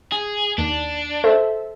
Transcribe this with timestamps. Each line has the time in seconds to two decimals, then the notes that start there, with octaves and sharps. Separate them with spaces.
0.12 G#4
0.58 D#2 D4
1.24 A4 C5 E5